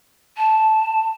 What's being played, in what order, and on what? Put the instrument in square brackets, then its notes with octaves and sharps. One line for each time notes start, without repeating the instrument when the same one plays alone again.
[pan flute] A5